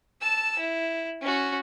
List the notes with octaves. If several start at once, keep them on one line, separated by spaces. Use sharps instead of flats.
A5 E6
E4
C#4 F#4